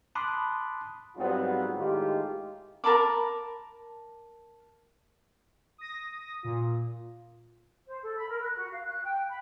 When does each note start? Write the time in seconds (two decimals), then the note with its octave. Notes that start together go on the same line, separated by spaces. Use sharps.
0.15 A5 B5 C6 D6 D#6 F#6
1.17 G#2 F#3 G3 B3 C4 F4
1.77 A2 D#3 G#3 F4 G4
2.84 A#4 A5 B5 D6
5.78 D#6 A#6
6.44 A#2 F4
7.87 C5
8.01 A4
8.15 B5
8.28 A#4
8.41 F#6
8.56 F#4
8.72 F5
8.85 F#6
9.03 G5
9.28 B5